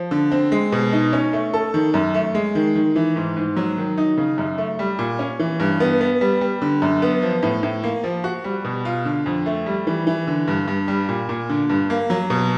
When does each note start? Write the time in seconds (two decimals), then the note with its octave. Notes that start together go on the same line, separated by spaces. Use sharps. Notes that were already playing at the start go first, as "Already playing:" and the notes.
Already playing: F3
0.11 D3
0.31 C4
0.52 G#3
0.72 B2
0.93 D#4
1.13 C#4
1.33 A3
1.54 A4
1.74 D#3
1.94 F#2
2.14 A3
2.35 G#3
2.55 D#3
2.75 D#3
2.96 E3
3.16 G#2
3.37 G#2
3.57 F#3
3.77 D#3
3.98 D#4
4.18 C#3
4.38 F#2
4.58 A3
4.79 G3
4.99 A#2
5.19 C#4
5.39 E3
5.60 G2
5.80 B3
6.01 B3
6.21 G3
6.41 G3
6.62 D3
6.82 F#2
7.02 B3
7.22 F3
7.43 A2
7.63 A2
7.83 A#3
8.04 F3
8.24 F#4
8.44 G3
8.64 B2
8.85 F4
9.05 D3
9.26 F2
9.46 A3
9.66 G3
9.87 E3
10.07 E3
10.27 D3
10.48 G2
10.68 G2
10.88 G3
11.09 A#2
11.29 A#2
11.49 D3
11.69 G2
11.90 A#3
12.10 F#3
12.30 B2